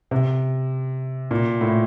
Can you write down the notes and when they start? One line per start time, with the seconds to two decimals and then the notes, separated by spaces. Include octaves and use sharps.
0.11 C3
1.31 A#2
1.61 A2